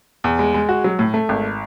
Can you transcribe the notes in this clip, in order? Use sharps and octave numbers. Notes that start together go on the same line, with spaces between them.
E2
G#3
G#3
F#4
F#3
A2
A3
G#1